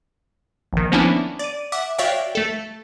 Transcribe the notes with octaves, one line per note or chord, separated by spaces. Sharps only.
A#1 D#3
F3 A#3 B3 C#4 D4 E4
D5 D#7
E5 F#5 D6
F#4 C#5 D5 E5 F5 G5
A3 A4